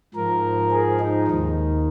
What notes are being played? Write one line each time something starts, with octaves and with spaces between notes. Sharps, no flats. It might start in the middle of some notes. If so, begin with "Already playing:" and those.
G#2 F3 A#4
G#4
D#4
D#2 D#3